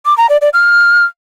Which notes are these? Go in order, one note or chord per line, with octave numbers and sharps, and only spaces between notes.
D6
A#5
D5
D5
F6